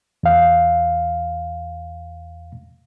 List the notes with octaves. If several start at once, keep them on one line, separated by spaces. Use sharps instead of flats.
E2 F5